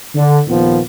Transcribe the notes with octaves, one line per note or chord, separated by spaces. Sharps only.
D3
D#2 A#2 F3 B3